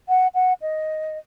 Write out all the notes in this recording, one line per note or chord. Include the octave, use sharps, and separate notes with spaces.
F#5
F#5
D#5